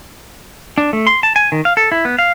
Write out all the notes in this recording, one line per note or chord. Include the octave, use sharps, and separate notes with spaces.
D4
A3
C6
A5
G#5
D#3
F5
A4
E4
B3
F5